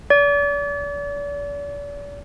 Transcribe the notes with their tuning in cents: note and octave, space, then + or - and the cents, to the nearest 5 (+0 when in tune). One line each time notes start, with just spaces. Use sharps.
D5 -40